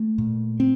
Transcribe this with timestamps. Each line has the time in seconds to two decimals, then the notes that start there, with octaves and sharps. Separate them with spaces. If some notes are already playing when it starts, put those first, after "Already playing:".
Already playing: A3
0.18 A#2
0.60 C4